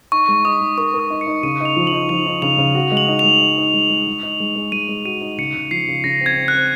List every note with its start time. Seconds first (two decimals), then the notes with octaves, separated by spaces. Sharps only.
0.12 D#4 C#6
0.28 G#3
0.45 D#4 D#6
0.61 G#3
0.77 A#4 C#6
0.94 A#4
0.99 D#6
1.10 D#4
1.21 C#7
1.27 D#4
1.43 C#3 D#7
1.60 D#4 F7
1.76 F3
1.87 F#7
1.93 D#4
2.09 F3 F7
2.26 D#4
2.42 C#3 F7
2.58 C#3
2.75 F#4
2.91 G#3
2.97 F#7
3.08 D#4
3.19 G#3 F7
3.41 D#4
3.58 D#4
3.74 G#3
3.90 G#3
4.07 G#3
4.23 D#4
4.40 G#3
4.56 G#3
4.72 G#3 D#7
4.89 G#3
5.05 F#4 D#7
5.21 D#4
5.38 C#3 C#7
5.55 C#3
5.71 F3 C7
5.88 C#3
6.04 C#3 A#6
6.21 C4
6.26 G#6
6.37 C4
6.48 F#6
6.54 C4